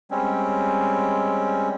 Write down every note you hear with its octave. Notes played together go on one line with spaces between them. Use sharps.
G3 G#3 C4 C#4